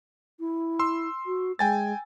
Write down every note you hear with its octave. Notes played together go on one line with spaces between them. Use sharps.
E4
C6 E6
F#4
G#3 G5 G#5 A6